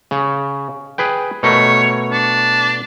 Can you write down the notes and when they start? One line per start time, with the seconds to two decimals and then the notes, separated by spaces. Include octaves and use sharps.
0.11 C#3
0.98 G#4 B4 G5
1.43 B2 A3 A#4 C#5
2.11 D4